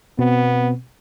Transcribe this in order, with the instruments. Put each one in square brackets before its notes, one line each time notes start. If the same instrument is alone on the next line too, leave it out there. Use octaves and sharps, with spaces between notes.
[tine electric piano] B2 C4 [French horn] B3